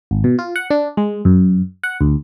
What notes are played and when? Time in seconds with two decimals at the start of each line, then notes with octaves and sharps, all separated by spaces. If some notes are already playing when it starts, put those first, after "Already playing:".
0.11 G#1
0.24 B2
0.39 F4
0.56 F#5
0.70 D4
0.97 G#3
1.25 F#2
1.83 F#5
2.01 D2